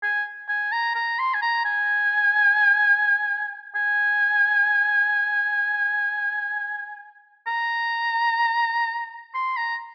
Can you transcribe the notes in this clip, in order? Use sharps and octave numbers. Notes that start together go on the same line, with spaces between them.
G#5
G#5
A#5
A#5
C6
G#5
A#5
G#5
G#5
A#5
C6
A#5